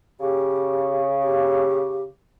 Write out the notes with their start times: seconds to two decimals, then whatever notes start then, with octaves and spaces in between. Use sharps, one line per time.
0.20 C#3 G4
1.23 G4